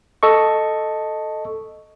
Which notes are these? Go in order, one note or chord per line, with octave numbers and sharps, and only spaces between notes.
A4 D#5 C#6